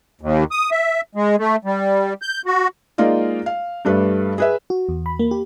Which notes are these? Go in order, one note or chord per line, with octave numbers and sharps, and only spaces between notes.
D#2
D#6
E5
G#3
A3
G3
G6
F#4
G#3 A#3 D#4 F4 D5 D#5
F5
G2 G3 A3 B4
G#4 B4 E5
F#4
E2
B5
A#3
G4